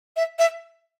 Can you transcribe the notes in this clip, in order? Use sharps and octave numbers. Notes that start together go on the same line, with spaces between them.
E5
E5